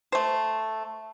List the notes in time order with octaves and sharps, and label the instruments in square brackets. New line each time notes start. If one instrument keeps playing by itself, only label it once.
[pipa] A3 C5